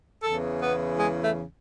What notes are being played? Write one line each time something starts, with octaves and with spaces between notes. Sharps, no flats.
E2 C#3 E3 A4
B3
G#3
A3